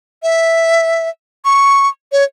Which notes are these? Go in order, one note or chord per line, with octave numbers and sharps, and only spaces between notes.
E5
C#6
C#5